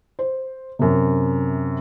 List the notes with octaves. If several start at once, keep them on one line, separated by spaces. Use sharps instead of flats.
C5
F#2 C3